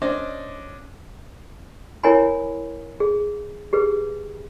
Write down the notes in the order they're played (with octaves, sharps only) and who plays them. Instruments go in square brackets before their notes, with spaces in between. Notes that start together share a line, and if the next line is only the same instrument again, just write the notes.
[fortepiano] C#4 D4 C5 D5 D#5
[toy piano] E4 A#4 C#5 F#5 G#5 B5
G#4
G4 G#4 B4